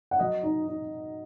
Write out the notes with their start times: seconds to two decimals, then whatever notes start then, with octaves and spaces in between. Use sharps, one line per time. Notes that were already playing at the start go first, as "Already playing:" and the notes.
0.11 F#5
0.19 F#3 D#5
0.43 D#4
0.67 D#4